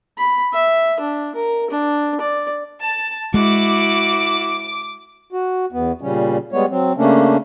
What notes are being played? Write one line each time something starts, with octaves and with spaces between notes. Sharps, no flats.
B5
E5
D4
A#4
D4
D5
A5
G#3 E4 F#4 D6
F#4
E2 B3
A#2 C#3 G3 C#4
G3 G#3 B3 C#5
F#3 C4
C#3 A3 A#3 C#4 D4